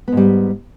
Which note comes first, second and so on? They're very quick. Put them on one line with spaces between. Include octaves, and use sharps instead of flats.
B3 G#2 G3